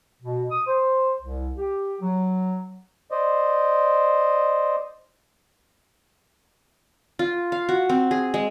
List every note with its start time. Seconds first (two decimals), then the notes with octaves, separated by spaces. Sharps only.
0.22 B2
0.50 D#6
0.67 C5
1.22 C2
1.57 G4
2.01 F#3
3.11 C5 D5 D#5
7.19 F4
7.52 F5
7.69 F#4
7.89 C4
8.11 G#4
8.34 G#3